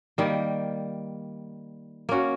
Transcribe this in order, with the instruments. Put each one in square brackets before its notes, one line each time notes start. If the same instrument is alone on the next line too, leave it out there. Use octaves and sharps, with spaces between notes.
[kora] D#3 G3 A#3
A#3 C#4 F#4